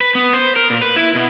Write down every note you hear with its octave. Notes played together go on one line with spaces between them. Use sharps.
B4
B3
C5
A#4
A#2
B4
E4
B2